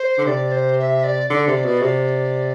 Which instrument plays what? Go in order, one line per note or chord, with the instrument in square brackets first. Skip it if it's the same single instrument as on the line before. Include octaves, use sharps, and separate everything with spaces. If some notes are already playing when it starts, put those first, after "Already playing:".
Already playing: [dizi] C5
[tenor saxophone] D3
[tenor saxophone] C3 [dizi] D5
[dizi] C5
E5
D5
[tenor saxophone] D3 [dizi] D5
[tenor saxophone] C3
B2
[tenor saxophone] C3 [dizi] D5